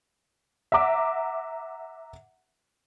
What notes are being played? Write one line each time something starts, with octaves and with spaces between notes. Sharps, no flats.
E5 F#5 A#5 D6